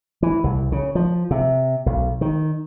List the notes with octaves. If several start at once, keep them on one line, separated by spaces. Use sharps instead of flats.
E3
C2
C#3
F3
C3
B1
D#3